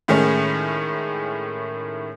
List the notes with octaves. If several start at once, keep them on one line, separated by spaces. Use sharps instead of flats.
A2 D#3 G#3 A3 C#4